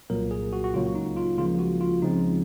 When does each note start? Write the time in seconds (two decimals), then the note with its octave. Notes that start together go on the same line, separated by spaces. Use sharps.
0.10 C2 A#2 F#3 A#3 A#4
0.31 G#4
0.53 F#4
0.64 F#4
0.74 C#2 C#3 F#3 A#3 F4
0.95 D#4
1.17 F4
1.38 C#2 C#3 F3 A#3 F4
1.59 F#4
1.81 F4
2.02 C#2 C#3 F3 G#3 C4 D#4